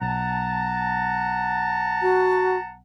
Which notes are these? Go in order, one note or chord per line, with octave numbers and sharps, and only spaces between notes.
B1 F#5 A5 A#5
F#4